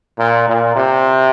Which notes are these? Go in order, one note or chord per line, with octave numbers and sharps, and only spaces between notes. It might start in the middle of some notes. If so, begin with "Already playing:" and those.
A#2
A#2
C3